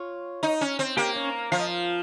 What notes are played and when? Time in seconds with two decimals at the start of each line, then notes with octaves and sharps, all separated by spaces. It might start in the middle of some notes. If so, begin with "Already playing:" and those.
Already playing: F4 C#5 C#6
0.43 D#4
0.61 C#4
0.79 C4
0.97 A#3 G4 G5
1.15 C#4 C#5
1.52 F3 F5
1.59 D#5
1.67 F4 F5